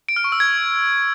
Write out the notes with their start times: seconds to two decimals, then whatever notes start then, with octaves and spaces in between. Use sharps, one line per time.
0.09 D7
0.16 F6
0.24 C#6
0.32 E6
0.40 G#6